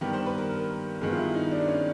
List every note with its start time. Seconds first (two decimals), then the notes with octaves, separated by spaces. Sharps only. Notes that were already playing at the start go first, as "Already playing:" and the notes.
0.01 G2 D#3 G3 B3 G4
0.13 C5
0.26 B4
0.38 A#4
0.51 A#4
1.01 G2 D#3 G#3 B3 G#4
1.11 F4
1.18 E4
1.35 D#4
1.51 D4
1.68 C#4